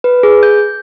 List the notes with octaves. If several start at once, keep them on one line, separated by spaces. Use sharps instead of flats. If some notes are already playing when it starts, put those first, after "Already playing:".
B4
G#4
G6